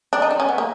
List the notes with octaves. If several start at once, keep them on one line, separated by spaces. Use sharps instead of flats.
D4
D#4
D4
C#4
B3
A#3